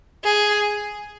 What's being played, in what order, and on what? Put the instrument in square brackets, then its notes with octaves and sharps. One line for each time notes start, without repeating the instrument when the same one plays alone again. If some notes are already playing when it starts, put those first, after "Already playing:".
[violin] G#4